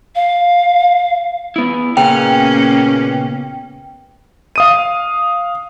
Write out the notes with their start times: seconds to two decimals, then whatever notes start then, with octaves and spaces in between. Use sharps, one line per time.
0.15 F5
1.56 B3 E4
1.97 A#2 C#3 A#3 B3 C#4 G5 A#5
4.56 F5 D#6 D#7